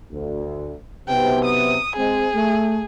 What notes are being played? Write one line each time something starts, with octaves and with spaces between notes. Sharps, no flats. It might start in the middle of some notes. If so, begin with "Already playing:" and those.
D2
B1 C3 B3 G5
D#6
G#3 C4 G#4
A3